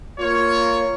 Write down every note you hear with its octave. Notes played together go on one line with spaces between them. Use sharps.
A#3 F4 C#5